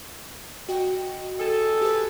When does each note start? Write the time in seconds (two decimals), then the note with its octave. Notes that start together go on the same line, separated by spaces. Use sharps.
0.69 F#4 D#5 G5
1.40 G#4 A4
1.82 G4 B4